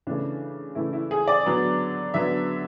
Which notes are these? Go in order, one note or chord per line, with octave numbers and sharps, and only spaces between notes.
C#3 E3 A3 D4
C#3 E3 A3 E4
E4
G#4
D5
D3 F#3 B3
D3 F#3 B3 E5